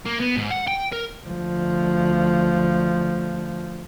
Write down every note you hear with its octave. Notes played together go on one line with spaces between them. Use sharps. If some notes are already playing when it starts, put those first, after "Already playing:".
A#3
B3
G#2
F#5
G5
A#4
D2 F3